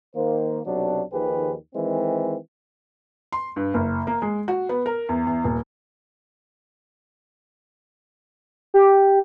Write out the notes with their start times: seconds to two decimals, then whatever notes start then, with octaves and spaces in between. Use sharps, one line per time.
0.16 D#3 A#3 C5
0.66 B1 C3 F#3 D4
1.13 D#2 D#3 F3 G4 G#4 B4
1.75 D#3 E3 G#3 C4
3.32 C6
3.56 G2
3.74 F#1
4.07 A#3
4.22 G#3
4.48 F#4
4.69 B3
4.86 A#4
5.09 E2
5.27 E2
5.44 D#1
8.74 G4